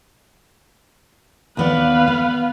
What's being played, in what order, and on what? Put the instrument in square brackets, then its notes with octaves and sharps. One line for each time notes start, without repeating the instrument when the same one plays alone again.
[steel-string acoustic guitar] D#2 B3 D5 [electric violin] B4 F5
[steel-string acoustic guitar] B3